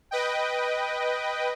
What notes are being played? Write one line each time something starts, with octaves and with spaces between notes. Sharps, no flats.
B4 D#5 G5